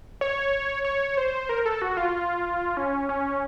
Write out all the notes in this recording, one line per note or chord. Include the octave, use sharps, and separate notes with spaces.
C#5
C#5
C5
A#4
A4
F#4
F4
C#4
C#4